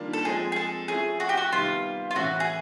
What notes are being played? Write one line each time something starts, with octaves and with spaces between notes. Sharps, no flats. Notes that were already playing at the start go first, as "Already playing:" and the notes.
Already playing: D#3 G3 A#3 D4 F4
A4
F3 G#3 C4 G#4
G#4
A4
F3 A3 C#4 E4 G#4
F#4
G4
F#4
C3 D#3 G3 B3 F4
F4
A2 E3 A3 C#4 E4 F#4
G#4